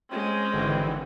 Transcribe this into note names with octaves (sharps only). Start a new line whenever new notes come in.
G#3 C4 C#4
G#1 D3 E3